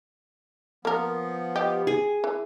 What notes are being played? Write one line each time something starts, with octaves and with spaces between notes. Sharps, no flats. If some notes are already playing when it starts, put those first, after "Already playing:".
F3 A#3 B3 A#4
G4 D#5
G#4
E3